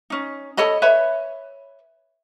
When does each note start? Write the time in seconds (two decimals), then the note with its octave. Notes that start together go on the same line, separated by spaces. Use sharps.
0.10 C#4 D#4
0.57 A4 C#5 D#5 B5
0.82 B4 C#5 E5 B5